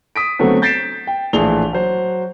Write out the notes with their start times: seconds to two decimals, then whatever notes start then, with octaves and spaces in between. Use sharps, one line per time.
0.16 D#6 B6 D7
0.39 D3 F#3 A3 B3 C4
0.62 G6 A6 B6 C7 D7 E7
1.07 G5
1.33 A#1 A2 E3 G#4 F7 G7
1.73 F#3 C5